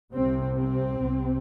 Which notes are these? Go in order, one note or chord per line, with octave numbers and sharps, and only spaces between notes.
C2 C3 C4
C4
C2 C3